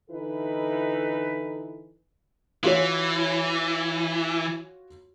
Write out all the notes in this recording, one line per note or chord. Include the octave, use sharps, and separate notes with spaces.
D3 E3 D#4 E4 A4 B4
E3 F4 F#4 C#5